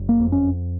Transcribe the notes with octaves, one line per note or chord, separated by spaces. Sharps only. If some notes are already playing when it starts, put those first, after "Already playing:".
Already playing: F#1
A#3
F2
C#4